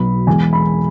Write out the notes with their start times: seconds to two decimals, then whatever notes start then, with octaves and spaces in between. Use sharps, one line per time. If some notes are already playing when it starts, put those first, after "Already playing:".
Already playing: B1 B2 F#3 B3 B5
0.27 E2 E3 G#3 G#5
0.53 B5